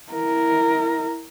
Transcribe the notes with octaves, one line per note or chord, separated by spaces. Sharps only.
E4 A#4